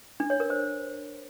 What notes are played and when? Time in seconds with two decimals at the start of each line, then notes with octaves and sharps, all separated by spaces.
0.20 D4
0.30 C#5
0.40 A#4
0.50 C5